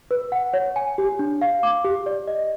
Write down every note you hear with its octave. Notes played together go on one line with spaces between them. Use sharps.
B4
F#5
C#5
G#5
G4
D4
F5
D6
G4
D5
D#5